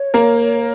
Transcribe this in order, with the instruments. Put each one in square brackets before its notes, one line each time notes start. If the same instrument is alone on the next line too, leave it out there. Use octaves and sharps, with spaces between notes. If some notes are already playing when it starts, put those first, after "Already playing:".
Already playing: [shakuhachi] C#5
[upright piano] A#3 A#4